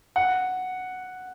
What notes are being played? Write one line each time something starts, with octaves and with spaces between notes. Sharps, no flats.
F#5